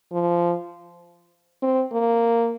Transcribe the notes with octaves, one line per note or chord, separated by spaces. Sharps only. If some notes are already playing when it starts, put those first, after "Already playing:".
F3
C4
A#3